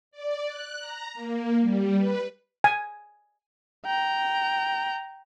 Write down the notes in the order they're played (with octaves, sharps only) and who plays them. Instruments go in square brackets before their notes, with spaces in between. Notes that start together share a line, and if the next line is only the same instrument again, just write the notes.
[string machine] D5
F#6
A#5
A#3
G3
B4
[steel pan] G#5
[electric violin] G5 A#5